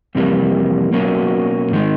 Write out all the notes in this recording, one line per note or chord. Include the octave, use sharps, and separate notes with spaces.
F2 C3 E3 G3 A#3
B1 B2 F#3 A#3 C#4
G#2 D#3 G#3